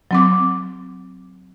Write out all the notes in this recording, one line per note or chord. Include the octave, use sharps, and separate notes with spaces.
F#3 C4 D6